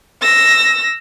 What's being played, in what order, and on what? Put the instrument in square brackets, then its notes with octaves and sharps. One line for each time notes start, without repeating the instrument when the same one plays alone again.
[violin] E6 A#6